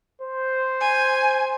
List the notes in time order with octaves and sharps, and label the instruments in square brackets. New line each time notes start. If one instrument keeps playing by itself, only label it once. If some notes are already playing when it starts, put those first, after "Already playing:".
[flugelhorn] C5
[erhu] G#5